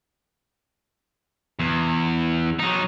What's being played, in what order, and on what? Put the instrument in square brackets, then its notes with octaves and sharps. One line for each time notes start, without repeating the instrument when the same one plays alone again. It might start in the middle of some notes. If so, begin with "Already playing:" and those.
[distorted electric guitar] E2
F#3 D#4